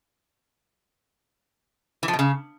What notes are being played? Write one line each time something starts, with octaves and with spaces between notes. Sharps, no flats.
E3
F3
B2
C#3